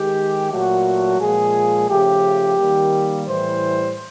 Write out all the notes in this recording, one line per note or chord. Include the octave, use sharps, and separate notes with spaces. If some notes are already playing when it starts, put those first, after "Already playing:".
Already playing: D#3 G#3 G4
A#2 F#3 A3 F#4
A#2 F3 G#3 G#4
C#3 F3 A3 G4
D#3 G3 A#3
A2 E3 G3 C5